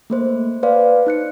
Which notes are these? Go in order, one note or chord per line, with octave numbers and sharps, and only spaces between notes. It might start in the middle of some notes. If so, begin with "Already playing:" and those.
A3 A#3 C5
B4 C5 D5 F5
D#4 F#6 C#7